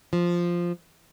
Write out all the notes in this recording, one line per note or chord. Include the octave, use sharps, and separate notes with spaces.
F3